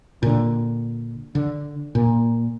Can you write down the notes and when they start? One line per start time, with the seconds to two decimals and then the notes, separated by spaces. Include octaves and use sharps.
0.23 A#2 D3
1.35 D3
1.95 A#2